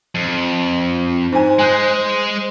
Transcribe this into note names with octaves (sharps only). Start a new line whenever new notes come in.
F2
G#2 C5 G#5
G#3 G#5 F#6 G6